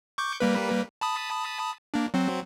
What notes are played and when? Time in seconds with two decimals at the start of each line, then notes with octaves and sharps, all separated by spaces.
0.18 C#6 D6 G6
0.40 G3 A#3 B4
1.01 A5 B5 D#6
1.94 A#3 D4
2.14 F#3 C4